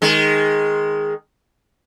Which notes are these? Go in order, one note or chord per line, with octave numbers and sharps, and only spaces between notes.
D#3 G#3